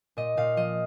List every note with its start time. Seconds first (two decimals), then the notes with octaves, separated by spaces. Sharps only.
0.17 A#2 D#5
0.37 A#2 F5
0.57 F3 D#5